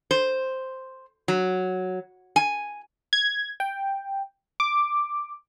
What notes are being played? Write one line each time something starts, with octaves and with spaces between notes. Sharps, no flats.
C5
F#3
G#5
G#6
G5
D6